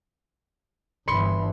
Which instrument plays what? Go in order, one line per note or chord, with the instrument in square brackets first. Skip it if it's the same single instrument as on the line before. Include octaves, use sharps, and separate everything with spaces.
[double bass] G1 E3 [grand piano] B5 C6 C#7